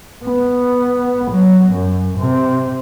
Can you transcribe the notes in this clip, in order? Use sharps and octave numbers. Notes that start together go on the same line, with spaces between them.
B3
F#3
F#2
C3